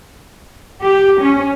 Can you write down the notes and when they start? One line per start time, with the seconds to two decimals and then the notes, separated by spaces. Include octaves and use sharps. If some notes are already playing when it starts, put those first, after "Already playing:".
0.81 G4
1.21 C#4